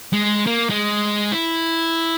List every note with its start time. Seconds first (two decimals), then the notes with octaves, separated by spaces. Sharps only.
0.13 G#3
0.46 A#3
0.70 G#3
1.32 E4